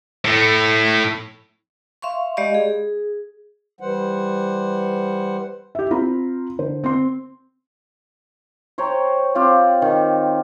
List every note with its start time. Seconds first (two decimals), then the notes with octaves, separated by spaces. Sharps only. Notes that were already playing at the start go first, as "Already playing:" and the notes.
0.25 A2 A3
2.02 E5 F5 C6 C#6
2.37 G#3 G4 D5 D#5 F5 B5
2.55 G#4
3.80 E3 G3 C5 F#5
5.75 G4 E5
5.91 C4 F4 A#5 B5
6.59 D3 C5
6.84 C4 C6
8.78 C5 C#5 G5 A#5
9.35 C4 F4 G4
9.82 D#3